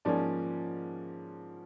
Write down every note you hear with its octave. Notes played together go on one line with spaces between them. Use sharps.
G#2 F3 A#3 C#4 D5